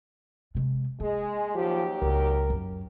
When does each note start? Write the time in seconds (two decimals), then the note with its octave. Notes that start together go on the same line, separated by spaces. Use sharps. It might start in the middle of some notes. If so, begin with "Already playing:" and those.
0.55 C3 G#3
1.00 G#3 A#3
1.55 D#2 F3 F#3 G4
2.02 C#2 A#4
2.50 F#2